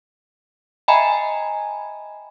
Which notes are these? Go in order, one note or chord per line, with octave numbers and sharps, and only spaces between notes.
D#5 E5 G5 G#5 A#5 B5